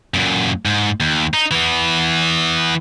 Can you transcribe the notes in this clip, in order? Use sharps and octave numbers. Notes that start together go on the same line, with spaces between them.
F#2 A#2
G#2
D#2
D#4
E3 B3